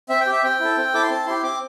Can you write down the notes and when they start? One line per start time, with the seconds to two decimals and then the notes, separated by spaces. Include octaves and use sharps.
0.09 C4 E5
0.20 G5
0.27 G4
0.32 E5
0.43 C4 G5
0.60 E4 A4
0.77 C4
0.94 E4 A4 D6
1.03 C6
1.10 C4 A5
1.26 E4 G4 C6
1.43 C4 D6